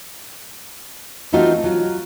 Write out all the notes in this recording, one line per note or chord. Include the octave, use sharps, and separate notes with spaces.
E3 A3 C4 D#4 F4 F#4
F#3 F4